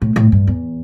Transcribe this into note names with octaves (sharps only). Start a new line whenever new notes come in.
A2
A2
G2
E2